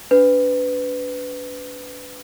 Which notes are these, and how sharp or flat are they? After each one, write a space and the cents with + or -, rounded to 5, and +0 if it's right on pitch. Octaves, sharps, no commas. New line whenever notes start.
D4 -40 B4 +20